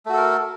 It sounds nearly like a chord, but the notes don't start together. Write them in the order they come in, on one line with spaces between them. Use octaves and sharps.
A3 F#4 A4 A#4